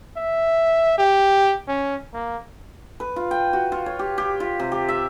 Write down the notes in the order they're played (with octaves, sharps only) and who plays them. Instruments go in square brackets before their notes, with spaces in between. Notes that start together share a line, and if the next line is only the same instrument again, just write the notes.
[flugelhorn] E5
G4
C#4
A#3
[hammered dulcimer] B4
F4
G5
F#4
F4
C#5
G4
G4
F4
C3
G4
E5